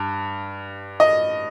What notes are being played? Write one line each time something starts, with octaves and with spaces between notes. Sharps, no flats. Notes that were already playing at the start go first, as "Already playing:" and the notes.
Already playing: G2
D#5